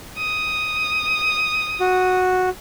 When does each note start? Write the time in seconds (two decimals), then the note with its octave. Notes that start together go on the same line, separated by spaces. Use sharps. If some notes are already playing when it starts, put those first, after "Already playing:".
0.17 D#6
1.80 F#4